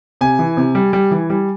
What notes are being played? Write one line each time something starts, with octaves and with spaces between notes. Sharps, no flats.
C3 G#5
E3
C3
G3
G3
E3
G3